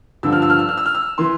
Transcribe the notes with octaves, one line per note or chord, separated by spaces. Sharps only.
G2 D3 F3 E6
F6
E6
F6
E6
F6
E6
F6
E6
E3 C6